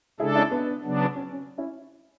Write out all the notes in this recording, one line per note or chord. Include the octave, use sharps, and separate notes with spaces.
C#3 G#3 D4 E4 G#4 A4
C#4 E4
B3 D4
C#3 F#3 B3 D4
C#4
C#4
C#4 E4